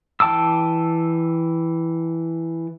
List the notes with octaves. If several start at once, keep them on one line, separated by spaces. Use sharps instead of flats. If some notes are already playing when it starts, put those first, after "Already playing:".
E3 G5 A5 D6 E6